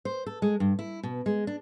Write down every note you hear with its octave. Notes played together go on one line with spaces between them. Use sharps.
C5
A4
G#3
G2
E4
B2
G#3
D4